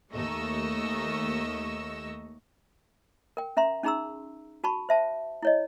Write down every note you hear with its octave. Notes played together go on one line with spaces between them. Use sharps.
D#2 A3 A#3 D#5 C#6 E6
A#4 G5
C#4 E5 A#5 C6
C#4 D#4 G#4 A#5 C6 E6
F#4 A5 B5 C#6
C5 E5 A5
E4 C#5 D#5